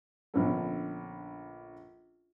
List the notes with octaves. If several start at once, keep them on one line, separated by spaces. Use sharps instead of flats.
A#1 D3 B3 C#4 A4